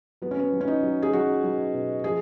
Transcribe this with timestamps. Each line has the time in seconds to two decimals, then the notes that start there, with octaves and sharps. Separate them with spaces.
0.22 F#3 B3
0.31 C#4
0.39 B3
0.52 F#3
0.61 C#4
0.68 D#4
0.83 F#3
1.02 G#4
1.13 F#3 F#4
1.43 F#3
1.74 B2
2.04 F3 G#4